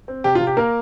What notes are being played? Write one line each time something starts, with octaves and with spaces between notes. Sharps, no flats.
C4
C3 G4
F4
C3
G4
A#3 A#4